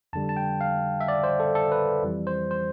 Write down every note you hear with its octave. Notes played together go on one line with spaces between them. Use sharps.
F2 D3 G3 A5
A5
G5
F5
E5
D5
C5
A4
A4
B4
F2 E3 G3
C5
C5